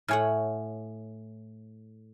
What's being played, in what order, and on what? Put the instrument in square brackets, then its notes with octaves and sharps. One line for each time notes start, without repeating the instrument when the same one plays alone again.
[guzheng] A2 C#5 F#5 [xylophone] A4 G#5 F6